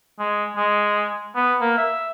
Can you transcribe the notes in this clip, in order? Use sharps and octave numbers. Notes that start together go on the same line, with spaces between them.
G#3
G#3
B3
A#3
E5